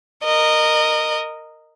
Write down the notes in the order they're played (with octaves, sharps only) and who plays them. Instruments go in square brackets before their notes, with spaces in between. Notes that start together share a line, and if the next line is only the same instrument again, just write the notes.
[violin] A#4 D#5